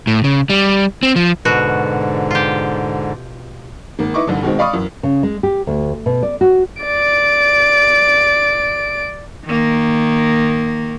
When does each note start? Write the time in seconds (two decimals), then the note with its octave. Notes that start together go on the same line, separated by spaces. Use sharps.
0.07 A2
0.24 C#3
0.50 G3
1.03 C4
1.16 F3
1.45 G#2 B2 D3 F#4
2.31 F4 G4
3.99 G#1 A#3
4.14 D#4 E4 B4 D#5 C#6 D6
4.27 F1 C2 G2 D3
4.43 B2 D#3 G#3 C4
4.59 D5 F5 B5 C#6 D#6
4.73 F#2 E3
5.03 C#3
5.23 G#3
5.43 G4
5.67 D2
6.06 B2
6.23 D5
6.41 F#4
6.83 D5 D7
9.46 D#3 A#3